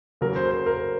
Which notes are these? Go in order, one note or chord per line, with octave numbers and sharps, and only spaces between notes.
C#3 F#3 A#3 A#4
C5
C5
A#4